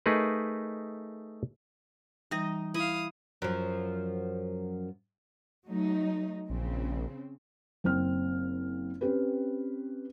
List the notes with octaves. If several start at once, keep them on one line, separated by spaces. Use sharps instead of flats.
A3 D#4 G#4 A#4 B4
E3 G3 D#4 D#5
E4 F5 D#6
F#2 F3
F#3 A3 D#4
A#1 C#3 C4
F#1 C4 F6
C4 C#4 G4 B4